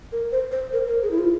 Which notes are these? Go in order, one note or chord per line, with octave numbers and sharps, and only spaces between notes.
A#4
C5
C5
A#4
A#4
G#4
E4
F4